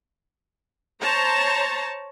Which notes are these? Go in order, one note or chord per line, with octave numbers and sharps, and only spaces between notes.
C5 C#5 A5 A#5